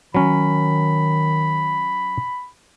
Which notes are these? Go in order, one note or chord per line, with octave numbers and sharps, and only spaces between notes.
D#3 F#3 C#4 B5